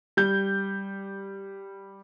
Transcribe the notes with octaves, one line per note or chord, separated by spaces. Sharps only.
G3 G6